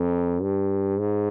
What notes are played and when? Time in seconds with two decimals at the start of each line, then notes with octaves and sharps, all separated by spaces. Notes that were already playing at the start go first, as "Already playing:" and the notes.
Already playing: F2
0.42 G2
0.98 G#2